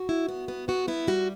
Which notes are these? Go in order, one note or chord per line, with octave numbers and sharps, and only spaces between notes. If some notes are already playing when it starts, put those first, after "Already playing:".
Already playing: F#4
E4
B3
B3
B3 F#4
B3 E4
G3 F#4